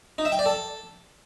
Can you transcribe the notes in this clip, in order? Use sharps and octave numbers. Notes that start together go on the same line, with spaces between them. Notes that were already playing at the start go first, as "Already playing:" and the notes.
D#4
E5
G5
D5
A4